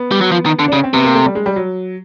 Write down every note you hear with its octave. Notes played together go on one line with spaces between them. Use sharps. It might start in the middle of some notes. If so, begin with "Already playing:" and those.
Already playing: B3
G3
F#3
F3
D#3
D3
D4
C#3 C#4
C4
C3 B3
A#3
A3
G3
G#3
G3
F#3